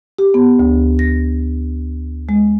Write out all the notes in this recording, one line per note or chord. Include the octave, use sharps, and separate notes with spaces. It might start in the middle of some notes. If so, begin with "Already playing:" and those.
G4
B3
D2
A#6
G#3